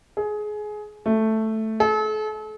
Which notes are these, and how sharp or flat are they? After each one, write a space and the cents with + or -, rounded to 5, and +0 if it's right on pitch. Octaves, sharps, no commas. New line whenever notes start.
G#4 +20
A3 +0
A4 -40